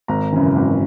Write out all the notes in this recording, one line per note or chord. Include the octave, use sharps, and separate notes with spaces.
G#1 A#5
F#2 C#3 E3
G#1